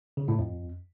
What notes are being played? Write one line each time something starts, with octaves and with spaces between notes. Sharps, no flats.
C#3
A2
F2